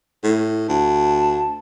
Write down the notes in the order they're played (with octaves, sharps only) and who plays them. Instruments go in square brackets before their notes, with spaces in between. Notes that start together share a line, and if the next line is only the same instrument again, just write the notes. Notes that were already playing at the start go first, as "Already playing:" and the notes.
[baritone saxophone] A2
[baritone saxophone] D2 [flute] A5